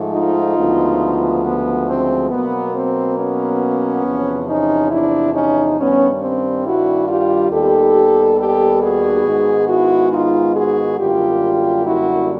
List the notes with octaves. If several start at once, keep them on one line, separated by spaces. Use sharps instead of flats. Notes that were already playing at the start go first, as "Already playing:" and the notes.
Already playing: G#2 F3 A3
D#4 F4
D2 C#3 F3 G#3 B3
B3
C4
B2 F#3 A#3 B3
C4
B3 C#4
E2 C3 F3
C#4 D#4
D4 E4
C#4 D#4
G2 D#3 G3 B3 C#4
C4
E4 F#4
F4 G4
D#2 D#3 G3 B3 G4 A4
G4 A4
F#4 G#4
G#2 D#3 G#3 B3
E4 F#4
D#4 F4
F#4 G#4
F#2 D3 G3 A#3 F4 G4
E4 F#4